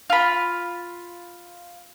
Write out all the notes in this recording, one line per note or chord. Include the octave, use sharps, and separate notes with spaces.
F4 B5